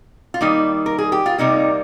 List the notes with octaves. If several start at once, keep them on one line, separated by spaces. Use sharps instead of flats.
F4
D#3 G3 A#3 D#4
A#4
G#4
G4
F4
C3 G3 A#3 D#4